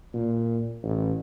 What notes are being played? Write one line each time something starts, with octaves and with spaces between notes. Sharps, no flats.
A#2
A1